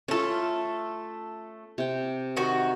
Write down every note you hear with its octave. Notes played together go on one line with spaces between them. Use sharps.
A3 C#4 F4 A4
C3 G5
D#3 F#4